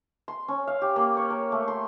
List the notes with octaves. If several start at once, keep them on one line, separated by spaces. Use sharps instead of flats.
C6
C#4
F5
G4
A#3
C#5
A#4
A3
C6